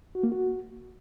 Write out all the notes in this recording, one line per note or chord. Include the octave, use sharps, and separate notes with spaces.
F#4
A#3
F#4